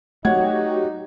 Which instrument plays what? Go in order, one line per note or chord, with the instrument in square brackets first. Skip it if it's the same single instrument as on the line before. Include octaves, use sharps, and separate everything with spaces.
[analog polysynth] F#3 F#4 G4 [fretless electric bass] A3 [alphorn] D#4 [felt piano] C#5 F#5 G#6